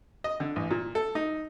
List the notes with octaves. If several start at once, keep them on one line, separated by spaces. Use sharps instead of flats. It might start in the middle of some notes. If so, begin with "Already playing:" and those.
D#5
D3
A1
A#2
A4
D#4